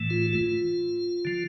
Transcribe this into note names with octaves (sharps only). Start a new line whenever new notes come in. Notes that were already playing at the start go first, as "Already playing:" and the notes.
Already playing: A2 E3 A3
F4
F4
D3 F3